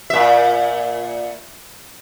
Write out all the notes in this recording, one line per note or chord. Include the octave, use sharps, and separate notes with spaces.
A#2 E5